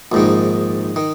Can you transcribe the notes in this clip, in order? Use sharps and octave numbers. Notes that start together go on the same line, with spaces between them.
A#1 G#2 D#3
D#3